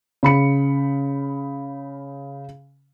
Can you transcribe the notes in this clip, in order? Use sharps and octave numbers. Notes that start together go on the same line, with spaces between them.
C#3 B5 C#7